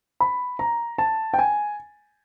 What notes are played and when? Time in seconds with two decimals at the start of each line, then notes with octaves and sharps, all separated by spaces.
0.21 B5
0.59 A#5
0.98 A5
1.34 G5
1.39 G#5